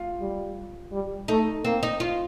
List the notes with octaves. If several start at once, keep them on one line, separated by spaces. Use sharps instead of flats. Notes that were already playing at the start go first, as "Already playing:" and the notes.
Already playing: F4
G3
G3
A3 D#4
A#3 C4
D#4
F4